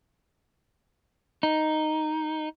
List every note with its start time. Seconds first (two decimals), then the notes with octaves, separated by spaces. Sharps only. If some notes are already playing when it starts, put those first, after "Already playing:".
1.43 D#4